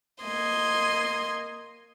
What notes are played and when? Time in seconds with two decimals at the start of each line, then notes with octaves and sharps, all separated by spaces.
0.24 A#3 D#5 C6 G#6